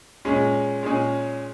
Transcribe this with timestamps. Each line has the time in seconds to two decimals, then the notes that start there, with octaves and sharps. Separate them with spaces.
0.25 A#2 G#3 C#4 G#4
0.83 A#2 G#3 C#4 G#4